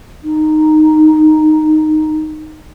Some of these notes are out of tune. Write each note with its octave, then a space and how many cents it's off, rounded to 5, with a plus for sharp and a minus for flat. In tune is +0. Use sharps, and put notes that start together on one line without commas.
D#4 -10